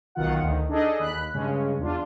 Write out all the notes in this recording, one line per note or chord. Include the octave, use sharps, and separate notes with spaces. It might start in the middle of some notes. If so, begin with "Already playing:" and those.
B1 B2 D#3 F4 F#5
D2 D#3
D4 D#4 G#4 A4 D#5
D#2 B5 F#6
G2 C#3 G#3 C#4
E2 D4 F4